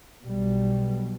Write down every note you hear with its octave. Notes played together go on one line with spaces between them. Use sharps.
B1 B2 G3